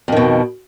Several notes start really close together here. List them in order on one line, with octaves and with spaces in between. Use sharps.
F2 D#3 B2